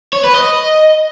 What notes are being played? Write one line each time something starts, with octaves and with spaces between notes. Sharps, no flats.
C#5
B4
D#5